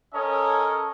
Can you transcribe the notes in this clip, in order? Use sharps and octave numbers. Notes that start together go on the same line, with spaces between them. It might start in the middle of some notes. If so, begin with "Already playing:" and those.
C#4 A4 A#4 C#5 D#5